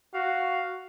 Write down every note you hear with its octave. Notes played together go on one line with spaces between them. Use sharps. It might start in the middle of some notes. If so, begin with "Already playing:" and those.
F#4 F5